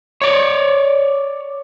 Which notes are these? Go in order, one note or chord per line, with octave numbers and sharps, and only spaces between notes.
C#5 D5